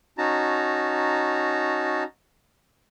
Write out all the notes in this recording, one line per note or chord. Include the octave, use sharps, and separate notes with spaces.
C#4 D#4 F#4 A5 A#5